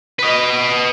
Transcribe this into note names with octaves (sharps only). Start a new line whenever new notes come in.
B4 D#5